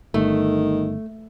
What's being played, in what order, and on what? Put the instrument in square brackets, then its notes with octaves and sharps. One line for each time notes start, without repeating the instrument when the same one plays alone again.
[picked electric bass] G1 [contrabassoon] D#3 [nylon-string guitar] A3